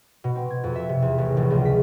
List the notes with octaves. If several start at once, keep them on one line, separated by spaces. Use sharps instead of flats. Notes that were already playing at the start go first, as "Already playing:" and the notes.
B2
C4
G#6
F2
E5
C3
E2
A1
A#1
C#2
B6